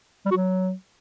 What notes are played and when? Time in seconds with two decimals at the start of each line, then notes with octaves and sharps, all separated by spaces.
0.26 G3
0.31 F#4
0.36 F#3